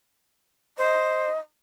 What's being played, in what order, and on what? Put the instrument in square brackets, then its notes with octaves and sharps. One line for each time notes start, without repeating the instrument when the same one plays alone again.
[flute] C5 [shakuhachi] D#5